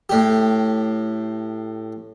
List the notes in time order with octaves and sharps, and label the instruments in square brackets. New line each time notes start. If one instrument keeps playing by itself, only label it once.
[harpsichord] A2 G4